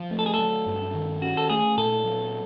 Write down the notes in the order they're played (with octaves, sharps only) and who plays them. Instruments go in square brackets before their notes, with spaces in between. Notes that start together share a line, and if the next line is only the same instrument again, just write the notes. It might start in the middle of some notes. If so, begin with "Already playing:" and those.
Already playing: [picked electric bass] F3
A3
[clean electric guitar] A4
G#4
A4
[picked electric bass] F#3
G2
D#3
[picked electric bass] C#4 [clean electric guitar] F#4
[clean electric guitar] A4
[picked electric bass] A3 [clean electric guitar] G#4
[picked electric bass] A#2 [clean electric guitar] A4
[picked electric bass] F#3